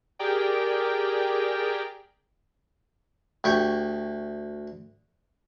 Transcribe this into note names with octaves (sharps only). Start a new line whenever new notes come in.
G4 G#4 A#4 D5 G5
D2 G4 C#6